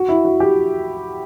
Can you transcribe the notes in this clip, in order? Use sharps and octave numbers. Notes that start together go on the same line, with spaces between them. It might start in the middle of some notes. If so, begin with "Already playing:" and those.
Already playing: F#4
E4
F#4
G4